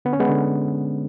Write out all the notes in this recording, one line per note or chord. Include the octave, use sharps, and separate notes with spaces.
D3 B3
C#4
G#3 B3
D3